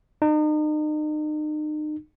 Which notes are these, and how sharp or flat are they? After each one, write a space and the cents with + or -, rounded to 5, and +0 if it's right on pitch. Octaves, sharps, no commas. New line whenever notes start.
D#4 -40